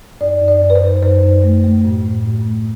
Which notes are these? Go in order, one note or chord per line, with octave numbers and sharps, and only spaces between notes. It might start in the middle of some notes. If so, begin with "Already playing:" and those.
F#2 D5
F#2
D5
F#2
B4
C5
F#2
F#2 C5
F#2
A3
A3
A2
A2
A2
A3